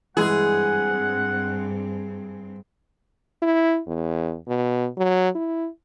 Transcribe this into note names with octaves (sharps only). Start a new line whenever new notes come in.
G2 E3 G#3 C4 G#4 F#5
E4
E2
B2
F#3
E4